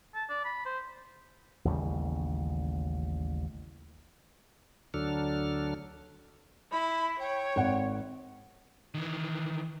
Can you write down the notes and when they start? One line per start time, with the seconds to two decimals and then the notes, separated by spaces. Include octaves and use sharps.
0.15 A5
0.29 D5
0.45 B5
0.66 C5
1.65 A1 D#2 C#3 G3
4.94 D2 D3 F#3 D4 A4 F6
6.71 E4 B5
7.19 C#5 G5
7.56 G#1 F#5
8.95 D#3 E3